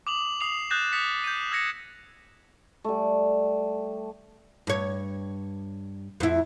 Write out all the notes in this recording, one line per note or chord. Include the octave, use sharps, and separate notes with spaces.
D6 D#6 F7 F#7
D#6 C7 F7
D#6 F#6 G6 A6 A#6 E7
D#6 A6 B6 C#7
G6 D#7
E6 G#6 A#6 C#7
G3 A3
G2 C#5
F2 E4